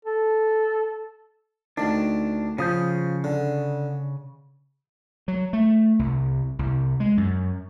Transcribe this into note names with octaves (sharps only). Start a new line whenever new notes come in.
A4
D2 D#3 D4
C#3 F3 D#6 G6
D3
F#3
A3
C2
C2
G#3
F#2